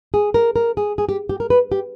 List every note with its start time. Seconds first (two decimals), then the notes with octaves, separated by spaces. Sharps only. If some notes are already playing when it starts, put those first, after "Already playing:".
0.14 G#4
0.34 A#4
0.56 A#4
0.77 G#4
0.98 G#4
1.09 G4
1.29 G4
1.40 A#4
1.50 B4
1.72 G4